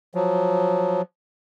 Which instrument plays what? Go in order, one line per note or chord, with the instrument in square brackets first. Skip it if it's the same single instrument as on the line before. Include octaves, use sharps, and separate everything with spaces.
[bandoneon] F3 F#3